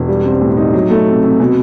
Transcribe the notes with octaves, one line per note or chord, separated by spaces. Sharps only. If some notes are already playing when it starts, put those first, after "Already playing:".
Already playing: E1
G3
C4
A2
D#4
F#3
A3
C3
C3
B2